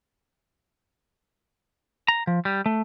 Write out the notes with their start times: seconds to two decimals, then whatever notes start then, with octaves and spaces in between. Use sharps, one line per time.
2.08 A#5
2.27 F3
2.45 G3
2.66 A3